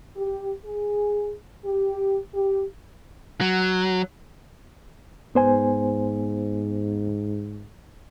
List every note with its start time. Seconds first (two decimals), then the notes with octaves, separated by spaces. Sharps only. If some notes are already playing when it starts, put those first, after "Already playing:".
0.17 G4
0.65 G#4
1.65 G4
2.34 G4
3.41 F#3
5.35 G#2 B3 C5 G#5